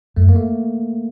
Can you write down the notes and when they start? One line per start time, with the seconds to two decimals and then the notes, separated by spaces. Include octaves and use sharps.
0.16 F#2 A3
0.29 A#3
0.36 A3